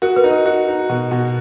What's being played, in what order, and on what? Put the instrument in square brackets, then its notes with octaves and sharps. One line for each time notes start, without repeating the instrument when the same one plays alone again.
[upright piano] F#4 [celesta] A#4
[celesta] B4
[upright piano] D#4
[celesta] A#4
[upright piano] F#4
D#4
B2
B2